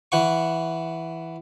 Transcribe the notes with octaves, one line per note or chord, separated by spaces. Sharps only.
E3 F#5 C#6